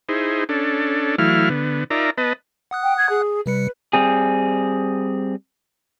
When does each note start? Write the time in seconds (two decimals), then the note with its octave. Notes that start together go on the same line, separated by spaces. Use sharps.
0.09 D#4 E4 G#4 C5
0.49 C#4 D4 A4
1.18 E3 F#3 A3 E4 F5 F6
1.49 D3 B3
1.90 D#4 F4 A#4 D5 E5 A#5
2.18 B3 B4 D#5 A5
2.71 F#5 D#6 F#6
2.83 G5
2.98 G#6
3.09 G#4
3.46 C3 G3 B4 C#7
3.93 G3 C4 G#4